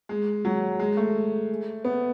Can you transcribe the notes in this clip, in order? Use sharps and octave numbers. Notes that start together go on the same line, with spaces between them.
G#3
F#3
G#3
A3
B3